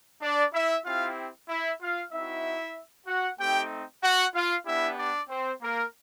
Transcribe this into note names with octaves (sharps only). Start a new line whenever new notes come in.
D4 D5
E4 E5
C4 E4 F4 G4 F5
E4 E5
F4 F5
C4 D#4 E4 F#4 E5
F#4 F#5
A3 C4 D#4 G4 G5
F#4 F#5
F4 F5
B3 D4 E4 G4 E5
D4 D5
C4 C5
A#3 A#4